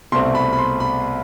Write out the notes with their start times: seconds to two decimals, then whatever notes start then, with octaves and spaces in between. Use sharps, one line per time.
0.12 C2 B2 A3 C4 C6
0.35 B5
0.53 B5
0.59 C6
0.80 B5